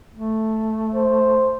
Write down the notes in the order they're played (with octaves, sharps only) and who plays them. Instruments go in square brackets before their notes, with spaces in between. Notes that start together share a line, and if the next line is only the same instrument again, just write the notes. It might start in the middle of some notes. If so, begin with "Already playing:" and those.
[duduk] A3
[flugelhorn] C5